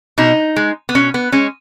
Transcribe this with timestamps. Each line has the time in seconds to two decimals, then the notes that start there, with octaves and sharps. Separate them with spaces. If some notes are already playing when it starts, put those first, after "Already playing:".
0.18 B2 D#4
0.56 G#3
0.89 B3
0.95 B2 C#4
1.14 B3
1.32 G#3 C#4